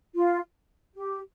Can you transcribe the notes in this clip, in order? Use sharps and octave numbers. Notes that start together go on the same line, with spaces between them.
F4
G4